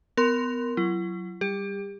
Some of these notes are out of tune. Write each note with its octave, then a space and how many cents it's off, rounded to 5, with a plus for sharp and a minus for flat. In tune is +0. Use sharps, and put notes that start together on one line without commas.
B3 +25 A#4 +0 C6 +0
F#3 +0 E4 +45
G3 +0 G4 +35